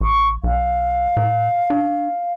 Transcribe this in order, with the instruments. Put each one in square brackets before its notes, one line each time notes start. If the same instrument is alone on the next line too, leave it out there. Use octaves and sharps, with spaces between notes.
[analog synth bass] A1 [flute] C#6
[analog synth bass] B1 [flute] F5
[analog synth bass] A2
D4